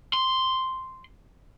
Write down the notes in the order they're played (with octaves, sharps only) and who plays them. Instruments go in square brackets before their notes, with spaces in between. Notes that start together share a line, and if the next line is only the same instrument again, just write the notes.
[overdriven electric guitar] C6